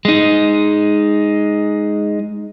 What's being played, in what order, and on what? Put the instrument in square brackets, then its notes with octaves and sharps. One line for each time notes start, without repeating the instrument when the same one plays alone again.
[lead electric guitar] G#3 D#4